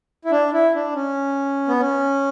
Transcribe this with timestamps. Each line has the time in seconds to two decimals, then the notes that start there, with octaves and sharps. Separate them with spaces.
0.25 E4
0.31 D4
0.53 E4
0.75 D4
0.95 C#4
1.68 B3
1.80 C#4